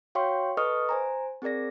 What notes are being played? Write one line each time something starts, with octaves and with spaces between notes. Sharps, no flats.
F#4 C#5 F5 G5 C6 C#6
A4 B4 D#5 C#6 D#6 F6
C5 G#5 A#5
C4 G#4 A#4 D5 A#6